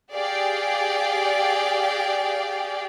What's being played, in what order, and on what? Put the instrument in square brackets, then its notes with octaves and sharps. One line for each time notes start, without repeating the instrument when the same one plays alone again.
[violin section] G4 G#4 D5 F5 G5